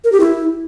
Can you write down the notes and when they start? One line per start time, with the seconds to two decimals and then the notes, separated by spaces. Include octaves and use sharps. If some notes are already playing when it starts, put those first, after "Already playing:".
0.04 A#4
0.12 G4
0.20 E4